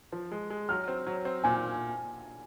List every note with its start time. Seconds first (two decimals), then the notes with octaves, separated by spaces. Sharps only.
0.12 F3
0.32 G#3
0.50 G#3
0.69 F#3 F6
0.88 C4
1.07 F#3
1.25 C4
1.44 A#2 G#5